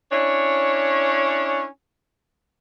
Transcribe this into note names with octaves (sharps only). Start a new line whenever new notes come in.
C#4 D4 E4 C#5